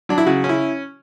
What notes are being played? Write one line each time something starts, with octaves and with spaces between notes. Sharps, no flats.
F#3 D4
E4
C#3 F#4
C#4
E4